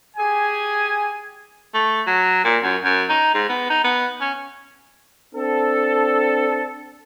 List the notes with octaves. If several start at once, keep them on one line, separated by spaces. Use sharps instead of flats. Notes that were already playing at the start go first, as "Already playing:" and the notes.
G4 G#4 G#5
A3
F#3
A#2
F#2
F#2
D#4
G#2
B3
D#4
B3
C#4
C4 D4 A4